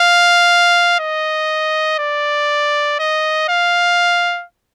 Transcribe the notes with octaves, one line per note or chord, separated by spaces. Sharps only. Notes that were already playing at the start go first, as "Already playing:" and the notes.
Already playing: F5
D#5
D5
D#5
F5